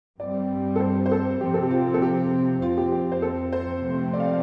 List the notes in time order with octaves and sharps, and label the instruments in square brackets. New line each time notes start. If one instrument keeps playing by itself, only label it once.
[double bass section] G2 G3 C4 [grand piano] D5
[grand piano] A4
C5
C5
A4
[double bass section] C3 F3 C4 [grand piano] G4
[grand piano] A4
G4
F4
A4
G4
[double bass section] F2 F3 C4 [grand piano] F4
[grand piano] G4
G4
C5
A4
C5
[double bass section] C3 F3 A3 C4
[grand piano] D5
F5
D5